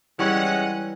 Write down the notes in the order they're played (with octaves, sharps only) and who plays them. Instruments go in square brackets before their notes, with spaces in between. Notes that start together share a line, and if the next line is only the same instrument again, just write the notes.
[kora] E3 G3 C#5 [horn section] G#3 C#4 F#5